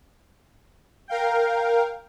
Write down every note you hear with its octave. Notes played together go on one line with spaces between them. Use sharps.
A#4 F5 G5